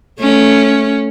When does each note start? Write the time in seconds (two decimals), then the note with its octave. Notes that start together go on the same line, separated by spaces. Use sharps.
0.20 A3 C#4